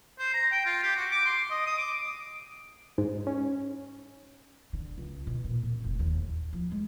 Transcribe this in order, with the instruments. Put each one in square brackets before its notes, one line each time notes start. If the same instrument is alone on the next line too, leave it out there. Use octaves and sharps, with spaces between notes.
[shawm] C5
A#5
G5
F4
G4
F#4
D6
C6
D#5
D#6
D6
[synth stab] G#2
C#4
[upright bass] D3
C#2
B2
A#2
C4
F1
D#2
A1
F3
G#3